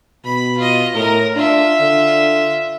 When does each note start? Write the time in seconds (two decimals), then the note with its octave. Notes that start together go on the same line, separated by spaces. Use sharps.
0.25 B2 B5
0.57 F4 D#5
0.95 A2 A#4 A#5
1.36 D4 F4 E5
1.81 D3